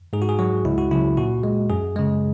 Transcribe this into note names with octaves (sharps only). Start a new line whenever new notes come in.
G#2 G#4
F#4
G#4
F#3 F#4
C#2 E4
F#4
C#3 F#3 E4
A#2 F#4
G#3
F#2 G#4
C#3 G#3